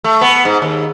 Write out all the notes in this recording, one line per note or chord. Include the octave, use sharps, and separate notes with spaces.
A3
B3
G#2
D#2